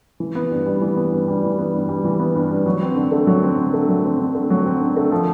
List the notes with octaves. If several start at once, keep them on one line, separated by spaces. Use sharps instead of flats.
E3
B3
G2
G3
E3
B3
G2
G3
E3
B3
G2
G3
E3
B3
G2
G3
F#3
C4
D3
A3
F#3
C4
D3
A3
F#3
C4
D3
A3
F#3
C4
D3
A3
F3